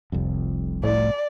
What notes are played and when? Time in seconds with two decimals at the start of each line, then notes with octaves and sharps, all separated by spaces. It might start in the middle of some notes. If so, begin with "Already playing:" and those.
0.12 F1 C2 F2
0.84 A2 D5